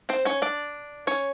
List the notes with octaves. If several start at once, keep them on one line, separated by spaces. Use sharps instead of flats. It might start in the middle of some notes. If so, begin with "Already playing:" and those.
C4 C5
C#4 C#5
D4 D5
C#4 C#5